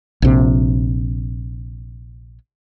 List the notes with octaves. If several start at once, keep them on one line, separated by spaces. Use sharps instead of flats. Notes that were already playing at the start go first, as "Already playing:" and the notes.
A#1 C3